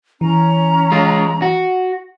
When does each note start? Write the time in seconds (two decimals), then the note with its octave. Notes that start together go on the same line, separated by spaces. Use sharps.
0.21 E3 C#4 A#5
0.92 G#3 F4
1.42 F#4